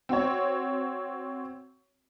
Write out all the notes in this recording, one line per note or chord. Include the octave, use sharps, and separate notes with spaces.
C4 F#4 C#5